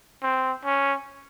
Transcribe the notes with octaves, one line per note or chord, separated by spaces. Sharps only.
C4
C#4